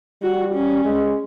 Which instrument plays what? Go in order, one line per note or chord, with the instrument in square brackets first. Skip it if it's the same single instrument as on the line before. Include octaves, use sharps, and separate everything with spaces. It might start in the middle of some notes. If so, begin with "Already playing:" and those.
[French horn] G3 [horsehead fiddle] F#4
[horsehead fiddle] C#4
[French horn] G#3